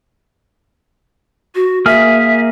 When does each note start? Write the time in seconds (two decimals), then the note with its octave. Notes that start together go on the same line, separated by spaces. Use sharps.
1.55 F#4
1.86 A#3 G#4 E5 F6